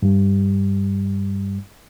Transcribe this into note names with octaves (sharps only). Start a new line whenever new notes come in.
G2 G3